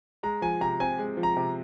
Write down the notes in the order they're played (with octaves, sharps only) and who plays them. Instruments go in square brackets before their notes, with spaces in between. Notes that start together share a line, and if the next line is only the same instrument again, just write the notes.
[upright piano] G#3 [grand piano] A#5
[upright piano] F3 [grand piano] G#5
[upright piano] C3 [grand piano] A#5
[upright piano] C4 [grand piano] G#5
[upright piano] G#3
F3
[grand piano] A#5
[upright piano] C3